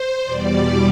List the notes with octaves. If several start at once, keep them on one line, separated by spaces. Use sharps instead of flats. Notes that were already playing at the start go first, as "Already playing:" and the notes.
Already playing: C5
E2 B2 G3 D5